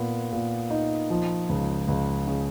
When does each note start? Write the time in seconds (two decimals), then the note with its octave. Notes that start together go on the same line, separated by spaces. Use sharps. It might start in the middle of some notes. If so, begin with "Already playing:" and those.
Already playing: A#2 B3
0.33 A#2
0.71 D#4
1.10 F3
1.49 C#2
1.88 C#2
2.27 C#3